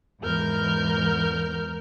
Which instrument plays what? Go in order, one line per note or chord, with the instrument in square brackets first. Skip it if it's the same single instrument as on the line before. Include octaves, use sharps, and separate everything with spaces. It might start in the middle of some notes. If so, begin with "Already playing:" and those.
[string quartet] E2 G#2 A#4 F6 G6